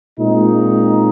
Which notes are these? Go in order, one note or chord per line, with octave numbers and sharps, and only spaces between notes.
A#2 G#3 C4 D#4